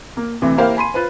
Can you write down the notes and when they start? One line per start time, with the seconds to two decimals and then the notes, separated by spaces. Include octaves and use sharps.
0.17 A#3
0.42 D2 C3 E3
0.58 A#3 E4 G4 A#4 C5 F5
0.77 G#5 B5 C6 D#7
0.94 F4 B4 C5